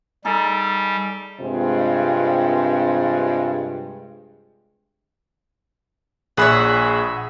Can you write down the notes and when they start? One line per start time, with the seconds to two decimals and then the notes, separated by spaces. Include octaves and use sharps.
0.25 G3 D#4 G#4 A4
1.40 G2 C3 G#3 C4 F4
6.37 A#1 G#4 C#5 E5 F#5 B5